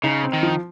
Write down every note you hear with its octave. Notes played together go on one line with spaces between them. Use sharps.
C#3 D#4
C4
D#3
F3